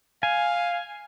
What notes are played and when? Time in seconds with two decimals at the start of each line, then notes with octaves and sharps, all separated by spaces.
0.23 F5 G#5